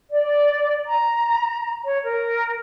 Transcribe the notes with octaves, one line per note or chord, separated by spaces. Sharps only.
D5
A#5
C#5
A#4